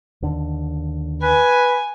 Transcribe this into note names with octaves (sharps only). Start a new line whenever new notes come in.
D#2 D3
B4 G#5